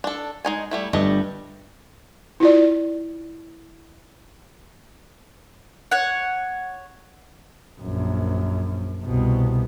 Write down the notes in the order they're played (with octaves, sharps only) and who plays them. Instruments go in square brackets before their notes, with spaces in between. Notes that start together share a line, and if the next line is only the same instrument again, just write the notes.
[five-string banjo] D4 A4
G#3 D#4 G#5
G3 A3 E4
[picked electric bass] G1 G2 [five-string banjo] G3 A3 D#5
[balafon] E4 F4 D5
[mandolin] C#5 F#5
[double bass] A#1 F#2
C2 B2